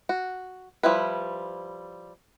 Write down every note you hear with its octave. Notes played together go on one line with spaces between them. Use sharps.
F#4
F3 G3 E4 B4